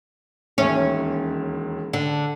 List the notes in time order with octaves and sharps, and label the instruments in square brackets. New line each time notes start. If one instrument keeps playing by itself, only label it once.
[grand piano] E1 D#2 E5 [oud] C#4
[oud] D3